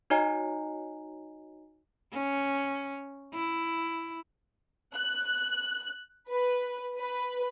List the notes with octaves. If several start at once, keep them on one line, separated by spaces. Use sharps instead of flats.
D#4 F#4 C#5 D#5 G#5 A#5
C#4
E4
F#6
B4
B4